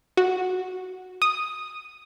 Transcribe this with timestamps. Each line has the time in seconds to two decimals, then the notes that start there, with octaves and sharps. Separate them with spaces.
0.17 F#4
1.22 D#6